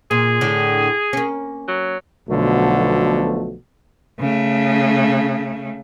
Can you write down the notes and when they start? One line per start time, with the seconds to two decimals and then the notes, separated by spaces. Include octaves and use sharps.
0.11 A#2 G#4
0.41 A2 D3 D4
1.13 A#3 C#4
1.68 F#3
2.28 B1 B2 D3 F3 A3
4.20 C#3 A3